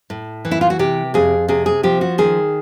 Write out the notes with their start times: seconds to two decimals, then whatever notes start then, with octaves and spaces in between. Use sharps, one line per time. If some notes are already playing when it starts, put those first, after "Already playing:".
0.10 A2
0.45 E3
0.51 E4
0.61 F4
0.70 F#4
0.79 C3 G4
1.14 F2 G#4
1.48 C3 G#4
1.66 G#4
1.83 F3 G4
2.01 F#4
2.18 D#3 G#4